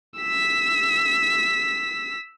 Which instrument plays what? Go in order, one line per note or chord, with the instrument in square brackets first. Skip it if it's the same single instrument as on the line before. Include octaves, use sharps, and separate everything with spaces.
[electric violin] E6 B6